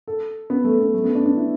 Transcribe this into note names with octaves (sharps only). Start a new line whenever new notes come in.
A4
B3
A3
B3
A3
B3
D4
D4
E4